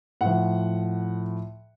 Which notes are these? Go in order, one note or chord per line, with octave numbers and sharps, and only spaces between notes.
A2 F3 F#5